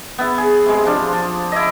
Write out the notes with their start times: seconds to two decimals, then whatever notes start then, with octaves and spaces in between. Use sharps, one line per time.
0.18 B3 E4
0.38 G#4
0.66 C3 G#3
0.85 F3 D4 F5
1.13 F3
1.52 E4 D#5